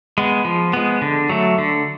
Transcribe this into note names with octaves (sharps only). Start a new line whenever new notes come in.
G#3 B3
F3
G#3 B3
D3
F#3 A3
D3